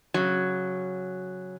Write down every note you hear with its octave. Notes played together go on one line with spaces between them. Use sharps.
C#3 F#3